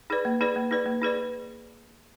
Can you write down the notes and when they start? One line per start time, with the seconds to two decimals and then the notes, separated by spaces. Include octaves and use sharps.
0.10 D#4 G#4 B4 D5
0.25 A#3
0.41 D#4 G#4 B4 D5
0.56 A#3
0.71 D#4 G#4 B4 D5
0.86 A#3
1.02 D#4 G#4 B4 D5